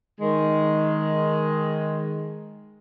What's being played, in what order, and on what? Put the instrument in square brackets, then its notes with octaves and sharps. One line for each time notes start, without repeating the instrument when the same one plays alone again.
[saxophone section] D#3 G#3